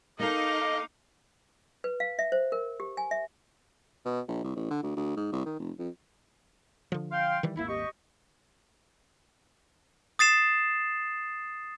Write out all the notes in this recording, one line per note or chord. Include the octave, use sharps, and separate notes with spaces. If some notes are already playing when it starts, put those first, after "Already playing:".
A#3 D#4 A4 D#5 F5 D6
B4
F5
E5
C5
A#4
G4
G#5
E5
B2
A#1
C2
A1
D3
D2
D2
G#2
C2
D#3
F1
F2
D3 F3
F5 G5 C6
D#3 E3 G3
D#1 G#1 A#3 E4
G4 D#5 C#6
D#6 A6 C7 E7